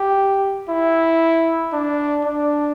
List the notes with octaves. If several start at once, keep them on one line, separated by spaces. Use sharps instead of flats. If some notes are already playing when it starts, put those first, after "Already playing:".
Already playing: G4
E4
D4
D4